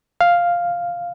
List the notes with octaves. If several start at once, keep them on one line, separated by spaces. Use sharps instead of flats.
F5